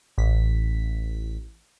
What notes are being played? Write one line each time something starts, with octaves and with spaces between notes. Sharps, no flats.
A1 B6